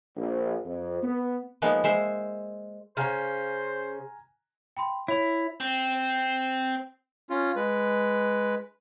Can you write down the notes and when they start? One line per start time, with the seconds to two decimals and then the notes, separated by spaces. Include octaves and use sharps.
0.16 A#1
0.64 F2
1.02 B3
1.62 F3 G#3 A#3 B3 D#4
1.84 G#3 C5 E5
2.97 C#3 C#4 C5 G#5 A#5 F6
4.77 G5 B5 C6
5.08 E4 C#5 F7
5.60 C4
7.30 C#4 F4
7.56 G#3 B4